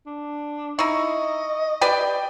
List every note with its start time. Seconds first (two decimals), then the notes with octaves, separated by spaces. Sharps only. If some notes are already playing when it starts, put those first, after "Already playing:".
0.06 D4
0.79 D#4 E4 D#5 C#6
1.81 G4 B4 D5 G5